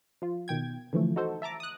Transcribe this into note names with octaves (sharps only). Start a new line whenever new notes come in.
F3 F4
B2 D#3 G5 G#6
D3 E3 F3 A3
D#4 F#4 A4 C5
E5 A5 A#5 D6
D#6 F#6